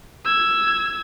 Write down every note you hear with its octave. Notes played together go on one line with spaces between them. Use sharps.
E6 G#6